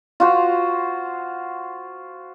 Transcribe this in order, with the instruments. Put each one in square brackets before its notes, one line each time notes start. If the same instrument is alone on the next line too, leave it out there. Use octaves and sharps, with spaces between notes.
[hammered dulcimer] F4 F#4 C5